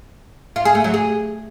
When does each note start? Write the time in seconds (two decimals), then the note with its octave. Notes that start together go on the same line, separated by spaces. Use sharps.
0.56 F4
0.65 G#4
0.75 A3
0.84 F#3
0.94 G#4